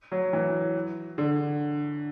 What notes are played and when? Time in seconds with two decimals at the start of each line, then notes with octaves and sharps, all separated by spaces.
0.12 F#3
0.33 E3
1.18 D3